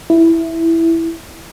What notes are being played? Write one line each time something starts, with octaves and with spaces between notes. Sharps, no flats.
E4